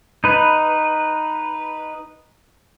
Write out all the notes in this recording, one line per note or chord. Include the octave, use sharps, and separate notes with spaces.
D#4 B4